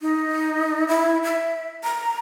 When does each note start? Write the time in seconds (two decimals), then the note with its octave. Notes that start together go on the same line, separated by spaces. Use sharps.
0.01 D#4
0.88 E4
1.24 E5
1.83 A#5